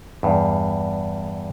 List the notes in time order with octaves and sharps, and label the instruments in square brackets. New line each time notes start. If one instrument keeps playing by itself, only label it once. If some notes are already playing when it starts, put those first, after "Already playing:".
[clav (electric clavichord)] E2 G2